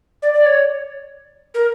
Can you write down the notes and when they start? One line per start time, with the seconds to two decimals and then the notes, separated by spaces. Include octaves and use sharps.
0.22 D5
0.34 D5
0.46 C#5
1.54 A#4